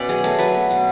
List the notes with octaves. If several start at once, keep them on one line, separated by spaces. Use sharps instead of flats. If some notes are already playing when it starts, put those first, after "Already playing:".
Already playing: B2 C#4 D5 E5
F#3 G#4
A3 A4
F#3 B4
B3
B2